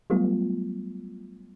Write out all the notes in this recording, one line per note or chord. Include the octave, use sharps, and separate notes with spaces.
F#3 G3 A3 B3 F4